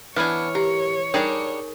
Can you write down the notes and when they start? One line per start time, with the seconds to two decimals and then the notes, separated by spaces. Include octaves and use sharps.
0.16 E3 B3 D4 E4 C#5 G#5 F6
0.55 G4 A#4
1.14 G3 D4 D#4 G#4 A#4